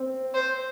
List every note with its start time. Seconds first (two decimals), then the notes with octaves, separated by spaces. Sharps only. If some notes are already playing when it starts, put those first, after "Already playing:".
Already playing: C4
0.34 C5